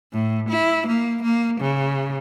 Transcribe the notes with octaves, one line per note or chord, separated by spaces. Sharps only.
A2
E4
A#3
A#3
C#3